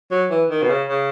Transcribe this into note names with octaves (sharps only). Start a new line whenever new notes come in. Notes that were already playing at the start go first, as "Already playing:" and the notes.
F#3
E3
D#3
B2
C#3
C#3